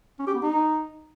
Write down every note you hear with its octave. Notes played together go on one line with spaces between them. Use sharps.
C#4
G4
B3
D#4